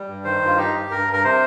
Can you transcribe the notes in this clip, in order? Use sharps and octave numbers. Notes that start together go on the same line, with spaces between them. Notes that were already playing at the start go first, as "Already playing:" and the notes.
Already playing: G3
G2
D#3 C5
G2
F4
D#4 G4
G2
G2 A#4
G2
A#4
C3 C5